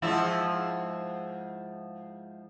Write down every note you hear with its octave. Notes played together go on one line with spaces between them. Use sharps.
G#2 F3 E4